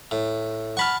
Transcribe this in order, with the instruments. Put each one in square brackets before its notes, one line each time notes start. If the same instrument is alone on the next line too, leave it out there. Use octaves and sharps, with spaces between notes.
[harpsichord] A2
[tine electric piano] F#5 B5 F6 [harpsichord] A5 C#6